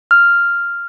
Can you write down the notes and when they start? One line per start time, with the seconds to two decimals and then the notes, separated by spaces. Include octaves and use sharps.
0.11 F6